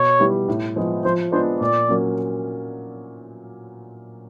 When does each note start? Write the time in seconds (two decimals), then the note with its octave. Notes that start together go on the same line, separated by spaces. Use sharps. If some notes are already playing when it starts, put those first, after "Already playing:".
Already playing: B2 C#5
0.19 G3 B3 E4 G4
0.48 A2
0.76 F3 G#3 B3
1.05 F3 C5
1.32 G#3 B3 D4 F4 C5
1.61 A#2 D5
1.88 F#3 A#3 C#4